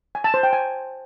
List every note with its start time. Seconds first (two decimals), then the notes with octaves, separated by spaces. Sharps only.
0.15 G#5
0.24 A5
0.34 C5
0.43 G5
0.53 G#5